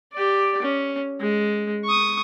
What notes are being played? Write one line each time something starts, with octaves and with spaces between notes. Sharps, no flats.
G4 D5
C#4
G#3
C#6 D#6